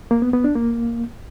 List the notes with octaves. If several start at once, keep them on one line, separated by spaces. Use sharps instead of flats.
A#3
B3
B3
D4
A#3